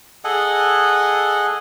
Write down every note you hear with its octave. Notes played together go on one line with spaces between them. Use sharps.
G#4 A4 D#5 F#5